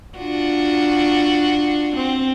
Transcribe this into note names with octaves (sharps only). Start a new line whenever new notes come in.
D4 F4 F#4
C4